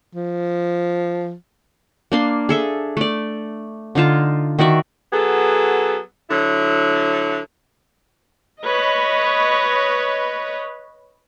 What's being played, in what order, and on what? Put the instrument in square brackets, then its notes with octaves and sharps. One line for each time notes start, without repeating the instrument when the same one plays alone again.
[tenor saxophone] F3
[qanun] A#3 D4 C6
G#4 A4 E5
A3 D5
D3 D#4 F4 A5
D#3 F#4 D5 E5
[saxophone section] F#3 B3 G#4 A4
D3 F#3 E4
[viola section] B4 C#5 D#5